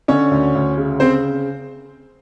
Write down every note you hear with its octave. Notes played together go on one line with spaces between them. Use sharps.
D3 C#4 C#5
D2
D2
C#3
C#3 C4 C5